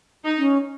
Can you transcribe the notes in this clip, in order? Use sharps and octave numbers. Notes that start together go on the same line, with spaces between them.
D#4
C#4